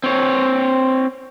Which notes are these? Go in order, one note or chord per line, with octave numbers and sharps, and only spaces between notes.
C4 C#5